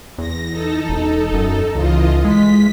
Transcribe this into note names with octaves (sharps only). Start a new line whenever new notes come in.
E2 A#6
D#4 A4
E1
F#2
C#2 E3 F4 D#5
G#3 B6